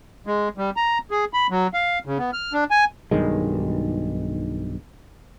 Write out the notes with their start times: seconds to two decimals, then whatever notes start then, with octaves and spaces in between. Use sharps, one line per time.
0.27 G#3
0.58 G3
0.77 A#5
1.11 G#4
1.34 B5
1.50 F#3
1.74 F5
2.06 C#3
2.19 B3
2.33 F6
2.53 D4
2.71 G#5
3.11 B1 G2 D#3 G#3